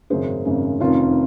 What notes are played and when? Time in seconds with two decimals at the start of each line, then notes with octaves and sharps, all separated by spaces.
0.10 G#1 F#2 C#3 G#4 C5
0.45 G#1 F#2 C#3
0.80 F1 F2 D#3 C#4 F4